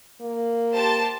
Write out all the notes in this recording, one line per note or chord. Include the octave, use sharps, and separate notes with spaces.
A#3
G4 C5 A5